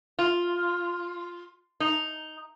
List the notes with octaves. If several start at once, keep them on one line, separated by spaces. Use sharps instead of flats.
F4
D#4